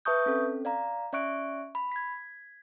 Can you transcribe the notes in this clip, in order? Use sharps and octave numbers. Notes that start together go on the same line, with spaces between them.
B4 E5 A5 C#6 D#6 G6
C4 C#4 A4
D5 F5 A#5
C#4 D5 E5 C#6 F#6 D7
B5
G#6 B6